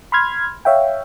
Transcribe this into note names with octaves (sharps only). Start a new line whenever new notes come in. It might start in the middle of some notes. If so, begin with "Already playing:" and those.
B5 C6 F6 G#6
C#5 E5 F5 G5